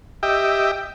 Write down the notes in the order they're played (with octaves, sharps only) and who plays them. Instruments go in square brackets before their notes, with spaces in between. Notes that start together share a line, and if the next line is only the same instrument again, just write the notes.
[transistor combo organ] G4 D#5 E5 G5